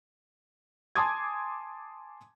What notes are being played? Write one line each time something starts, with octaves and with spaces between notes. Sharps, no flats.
G#5 A5 C6 D6 D#6 G#6